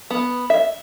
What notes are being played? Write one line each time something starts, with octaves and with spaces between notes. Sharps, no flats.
B3
E5